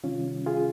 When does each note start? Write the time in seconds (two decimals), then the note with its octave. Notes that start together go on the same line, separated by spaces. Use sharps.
0.04 C3 D#3 G3 C#4 F4
0.46 F4 G#4